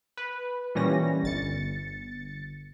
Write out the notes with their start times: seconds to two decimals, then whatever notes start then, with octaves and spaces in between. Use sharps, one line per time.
0.17 B4
0.75 A#2 E3 G3 C#4 A#6
1.23 G1 A6 C#7